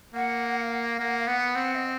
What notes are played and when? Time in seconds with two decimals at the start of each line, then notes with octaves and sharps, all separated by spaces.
0.14 A#3 F#5
0.61 F5
0.71 F#5
0.86 F5
0.99 A#3 F#5
1.18 F5
1.27 B3 F#5
1.56 C4
1.75 D#5